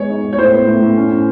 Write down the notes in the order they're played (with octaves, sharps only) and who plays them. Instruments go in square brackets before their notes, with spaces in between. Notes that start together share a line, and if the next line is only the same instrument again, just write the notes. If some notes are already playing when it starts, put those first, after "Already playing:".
Already playing: [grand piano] G#3 B3 [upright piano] C#5
[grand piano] D#4
G#3
[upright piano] C#5
[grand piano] A2 [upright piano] C5
[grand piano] B3
A2
A2
C#4
C#4